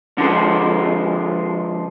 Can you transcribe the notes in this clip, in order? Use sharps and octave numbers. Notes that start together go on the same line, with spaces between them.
D3 F3 G#3